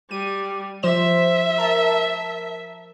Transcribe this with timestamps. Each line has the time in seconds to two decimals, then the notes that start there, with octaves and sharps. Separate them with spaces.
0.11 G3 D#7
0.83 F3 C5 E5 E7
1.58 A#4 A5